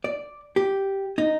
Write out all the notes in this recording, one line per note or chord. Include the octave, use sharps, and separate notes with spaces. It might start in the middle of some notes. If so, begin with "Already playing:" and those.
D5
G4
D#4